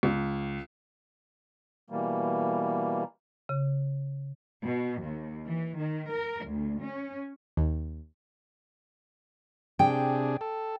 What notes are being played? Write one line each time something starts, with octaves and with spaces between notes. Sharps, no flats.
C#2
B2 E3 G3 A#3
C#3
B2
D#2
E3
D#3
A#4
D2
C#4
D#2
C3 D4 G#4 G5
A4